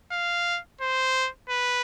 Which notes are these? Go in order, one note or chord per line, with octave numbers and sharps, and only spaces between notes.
F5
C5
B4